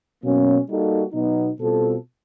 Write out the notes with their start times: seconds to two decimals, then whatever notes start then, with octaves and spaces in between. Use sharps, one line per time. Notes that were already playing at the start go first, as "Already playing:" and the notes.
0.22 B2 F#3 A#3 C#4
0.67 G3 A#3 D#4 F#4 A4
1.13 B2 F#3 B3 D#4
1.60 B2 G3 C4 F4 A4